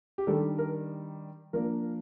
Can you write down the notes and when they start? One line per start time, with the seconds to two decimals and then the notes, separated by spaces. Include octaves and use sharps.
0.18 G4
0.27 D#3 G3 D4 A4
0.58 A#4
1.53 F3 A#3 D4 A#4